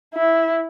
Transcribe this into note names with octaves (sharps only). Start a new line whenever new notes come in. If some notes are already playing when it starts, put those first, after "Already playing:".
E4